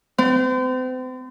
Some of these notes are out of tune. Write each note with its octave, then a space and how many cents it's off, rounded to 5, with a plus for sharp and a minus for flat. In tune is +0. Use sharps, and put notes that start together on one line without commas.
C4 -40